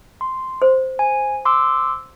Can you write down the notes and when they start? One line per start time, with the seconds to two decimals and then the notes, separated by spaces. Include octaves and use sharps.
0.21 C6
0.62 C5
0.99 G#5
1.45 C6 D6 E6